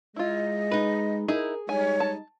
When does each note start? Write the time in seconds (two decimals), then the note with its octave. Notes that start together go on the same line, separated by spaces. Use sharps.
0.16 G#3 E4 F4 D#5
0.72 D#4 B4
1.28 D#4 E4 G#4 A#4
1.69 G3 G#3 D#4 C#5 G#5
2.00 A5